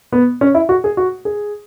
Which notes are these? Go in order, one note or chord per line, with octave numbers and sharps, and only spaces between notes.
B3
C#4
E4
F#4
G#4
F#4
G#4